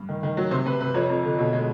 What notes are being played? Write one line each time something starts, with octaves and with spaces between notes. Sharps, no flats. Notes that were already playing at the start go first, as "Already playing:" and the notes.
Already playing: G2
D#3
D#3
F#3
C3 C5
C3 B4
C3 B4
F2 C#5
F2
D3
B2
G#3